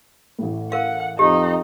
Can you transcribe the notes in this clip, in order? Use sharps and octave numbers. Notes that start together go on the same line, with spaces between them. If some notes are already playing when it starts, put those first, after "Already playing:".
A1 A2
A#4 F5 F#5
F2 D#4 G4